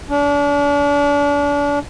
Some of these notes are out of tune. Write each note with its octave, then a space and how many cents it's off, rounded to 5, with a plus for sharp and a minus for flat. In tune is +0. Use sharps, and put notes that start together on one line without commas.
D4 -35